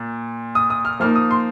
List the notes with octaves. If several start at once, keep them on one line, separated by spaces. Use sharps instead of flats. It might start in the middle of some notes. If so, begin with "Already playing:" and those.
Already playing: A#2
D#6
D#6
F6
F3 A#3 D#4 F6
D#6
C6